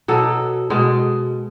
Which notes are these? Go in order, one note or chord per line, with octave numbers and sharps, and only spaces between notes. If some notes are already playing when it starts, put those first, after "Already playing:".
B2 F#3 A4
B2 G#3